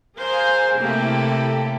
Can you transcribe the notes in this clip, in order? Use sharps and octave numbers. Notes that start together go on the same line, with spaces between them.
G#4 A#4 C5 F5 G#5
A2 C3 A#3 E4 G4 A4